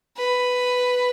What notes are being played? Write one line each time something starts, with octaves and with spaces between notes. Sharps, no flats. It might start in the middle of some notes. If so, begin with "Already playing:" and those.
B4